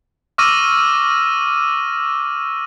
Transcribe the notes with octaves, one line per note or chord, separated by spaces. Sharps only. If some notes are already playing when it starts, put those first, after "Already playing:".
C#6 D6 E6 F6 A#6 D#7